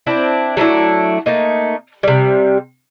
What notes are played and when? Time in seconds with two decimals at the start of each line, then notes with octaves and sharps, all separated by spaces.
0.06 C4 D4 E4
0.57 F#3 A3 D4 E4
1.26 A3 A#3 D#4
2.03 C3 G3